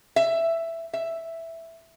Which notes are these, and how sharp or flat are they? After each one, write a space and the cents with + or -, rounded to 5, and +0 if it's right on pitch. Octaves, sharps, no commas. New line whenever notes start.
E5 +10
E5 +0